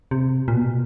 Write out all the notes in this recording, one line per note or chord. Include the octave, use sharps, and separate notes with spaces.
C3
A#2
B2